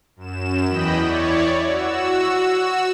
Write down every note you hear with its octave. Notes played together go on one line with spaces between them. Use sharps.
F#2 E7
E2 E3 D#5 G5 B5
E4 C#5 D5
F#4 E6